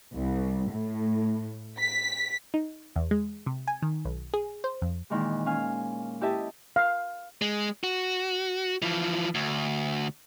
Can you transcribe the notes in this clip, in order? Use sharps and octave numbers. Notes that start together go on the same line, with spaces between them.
C2
A2
B6
D#4
E2
G#3
C3
G#5
D#3
B1
G#4
C5
F2
A#2 D#3 E3 G#3
C#4 F5 G#5 F6
E4 G4 D#5 E5 A5
F5
G#3
F#4
E3 F3
D2